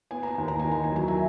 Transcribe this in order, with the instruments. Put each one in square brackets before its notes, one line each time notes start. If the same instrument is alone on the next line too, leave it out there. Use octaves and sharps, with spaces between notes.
[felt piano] B3 G#5
A#5
D#2 G#5
A#5
G#5
D#3
A#5
G#5
F#3 A#5
E5 G#5